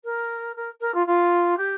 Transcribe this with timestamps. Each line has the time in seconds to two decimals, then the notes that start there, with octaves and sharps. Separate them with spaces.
0.04 A#4
0.56 A#4
0.81 A#4
0.94 F4
1.06 F4
1.57 G4